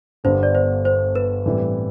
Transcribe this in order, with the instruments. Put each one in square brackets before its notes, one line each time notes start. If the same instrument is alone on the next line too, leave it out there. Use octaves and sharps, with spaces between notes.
[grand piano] G1 G2 D3 G3 B3 [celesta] C5
[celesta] D5
C5
C5
B4
[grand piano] A2 E3 G3 C4 E4